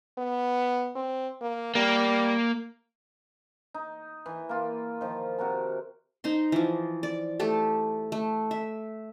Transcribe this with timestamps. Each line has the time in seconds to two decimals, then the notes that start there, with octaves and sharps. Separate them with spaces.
0.18 B3
0.96 C4
1.41 A#3
1.75 G3 A#3
3.74 D#4
4.26 E3
4.49 A#3 F4
5.01 D#3 F3
5.39 C3 F#4 A#4 A5
6.24 D#4 C5 C6
6.52 E3 F3
7.03 D5
7.40 A3 G4 A4
8.12 A3
8.51 E5